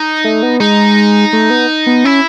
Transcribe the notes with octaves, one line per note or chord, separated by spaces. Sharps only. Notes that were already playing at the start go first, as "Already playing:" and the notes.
Already playing: D#4
A3
B3
G#3 D#4
A3
B3
B3
C#4 E4